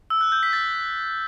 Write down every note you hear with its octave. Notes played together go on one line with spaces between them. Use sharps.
E6
F#6
G6
B6
A6